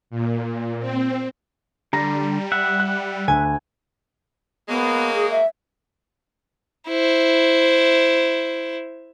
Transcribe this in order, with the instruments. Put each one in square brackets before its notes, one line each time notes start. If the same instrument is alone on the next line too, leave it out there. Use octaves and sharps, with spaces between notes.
[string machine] A#2
C4
[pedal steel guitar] D3 [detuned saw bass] G3 [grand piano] A#5 A#6
[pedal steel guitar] E5 F#5
[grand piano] F#6
[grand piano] D2 [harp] G#5
[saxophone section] F#3 G#3 A#3 [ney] B3
[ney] G#4
E5
[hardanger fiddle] E4 C5